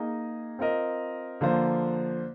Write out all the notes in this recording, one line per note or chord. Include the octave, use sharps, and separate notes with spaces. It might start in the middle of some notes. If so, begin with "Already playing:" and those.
Already playing: A#3 D#4 G#4 D#5
C4 F4 A#4 D#5
D3 F3 A#3 F4 C5